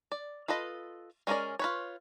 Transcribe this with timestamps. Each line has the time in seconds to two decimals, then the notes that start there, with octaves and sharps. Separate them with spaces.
0.12 D5
0.48 F4 A4 B4 D#5
1.27 G#3 C#4 E4 A#4 D5
1.59 F4 B4 C#5